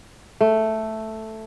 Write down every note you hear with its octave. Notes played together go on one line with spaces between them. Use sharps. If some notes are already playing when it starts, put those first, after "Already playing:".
A3